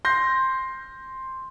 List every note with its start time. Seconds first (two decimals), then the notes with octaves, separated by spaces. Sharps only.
0.05 C6 G6 A#6